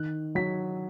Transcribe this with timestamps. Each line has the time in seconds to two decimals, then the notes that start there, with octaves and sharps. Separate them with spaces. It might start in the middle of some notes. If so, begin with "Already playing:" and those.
Already playing: D#3 F#6
0.35 F#3 B6